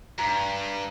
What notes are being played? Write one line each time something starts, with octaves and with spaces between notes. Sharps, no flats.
G2 A#5